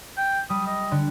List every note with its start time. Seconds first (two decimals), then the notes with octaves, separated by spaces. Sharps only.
0.17 G5
0.50 G3 D#6
0.67 D#5
0.91 D3